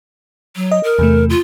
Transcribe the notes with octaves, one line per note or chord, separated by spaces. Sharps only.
F#3
D#5
A#4
E2 C3 A3
F4